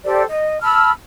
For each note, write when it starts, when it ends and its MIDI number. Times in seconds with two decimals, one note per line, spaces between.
0.04 0.24 67
0.04 0.24 69
0.04 0.24 72
0.04 0.24 74
0.29 0.61 75
0.62 0.91 81
0.62 0.91 83
0.62 0.91 88
0.62 0.91 89